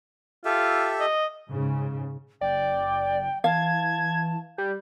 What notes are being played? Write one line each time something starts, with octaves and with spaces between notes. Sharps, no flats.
F4 G4 A4 E5
D#5
G#2 C#3
F#1 D5 G5
E3 F5 A5 G#6
G3 G6